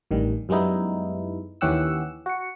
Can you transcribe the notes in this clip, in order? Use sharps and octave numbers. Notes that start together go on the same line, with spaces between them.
A1 G2 D#3 G3
F#2 G3 G#3 B3 D#4 E4
D#2 E3 C#4 G4 F#5 E6
F#4 C#7